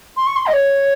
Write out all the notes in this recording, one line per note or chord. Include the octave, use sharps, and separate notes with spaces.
C6
C#6
C6
D#5
C#5